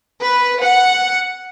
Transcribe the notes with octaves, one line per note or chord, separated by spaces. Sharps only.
B4
F#5